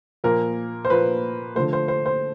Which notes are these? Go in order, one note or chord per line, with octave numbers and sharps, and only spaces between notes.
A#2 F3 A#3 A#4
C5
A#2 F3 A#3 B4
D3 F3 A3 C5
C5
C5
C5